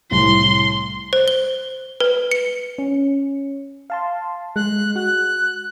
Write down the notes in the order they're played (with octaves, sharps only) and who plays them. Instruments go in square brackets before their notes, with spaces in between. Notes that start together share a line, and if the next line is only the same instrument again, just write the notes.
[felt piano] C2 A2 [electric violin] C6
[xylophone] C5
G7
B4
C#7
[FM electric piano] C#4
F5 A5 C6
[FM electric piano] G#3 [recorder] F#6
[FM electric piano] F#4 [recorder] F#6